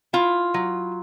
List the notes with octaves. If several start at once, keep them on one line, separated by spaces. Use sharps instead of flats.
E4 F4
F#3